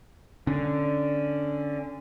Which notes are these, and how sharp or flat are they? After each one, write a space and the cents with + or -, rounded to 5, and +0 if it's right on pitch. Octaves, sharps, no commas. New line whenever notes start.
D3 +0 C#4 +0